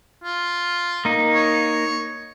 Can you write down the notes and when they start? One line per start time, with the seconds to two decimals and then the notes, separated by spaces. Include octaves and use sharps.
0.24 F4
1.05 A#3 D#4
1.34 C#5